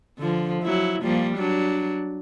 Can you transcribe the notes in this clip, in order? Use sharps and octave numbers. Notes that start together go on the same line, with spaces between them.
D3 F3
F#3 E4
F3 G3 A#3
F#3 D4